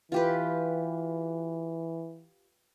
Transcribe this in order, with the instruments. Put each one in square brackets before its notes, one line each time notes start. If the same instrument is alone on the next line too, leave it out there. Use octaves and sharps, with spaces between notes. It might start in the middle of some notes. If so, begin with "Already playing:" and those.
[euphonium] E3 [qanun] F4 G4 B4